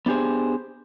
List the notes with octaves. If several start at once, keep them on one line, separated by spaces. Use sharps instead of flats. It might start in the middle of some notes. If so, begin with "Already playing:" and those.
B3 D4 G4 G#4 C5